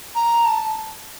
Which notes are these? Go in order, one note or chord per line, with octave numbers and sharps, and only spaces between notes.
A#5
A5